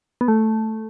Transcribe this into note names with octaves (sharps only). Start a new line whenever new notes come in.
B3
A3